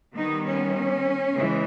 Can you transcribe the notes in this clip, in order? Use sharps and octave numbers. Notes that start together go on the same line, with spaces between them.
D#3 G3 B3 D#4
C#4
C#3 E3 G#3